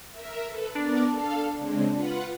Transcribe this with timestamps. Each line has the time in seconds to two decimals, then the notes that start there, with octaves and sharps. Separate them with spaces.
0.11 A#4 E5
0.45 A4 B4
0.75 B3 D4 A#4 D5
1.08 A4 F5
1.57 C#3 G#3 C4
1.91 F4 B4 F#5